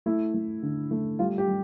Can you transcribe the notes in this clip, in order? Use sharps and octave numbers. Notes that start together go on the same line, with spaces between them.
A3 E4
A3
D3
A3
G3 F4
G4
G3